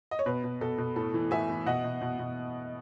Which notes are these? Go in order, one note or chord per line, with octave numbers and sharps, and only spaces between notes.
D#5
C#5
B2 B4
B2
B2 A4
B2
A2 A4
E3
A2 E5 G#5
E3
B2 D#5 F#5
B2
B2
B2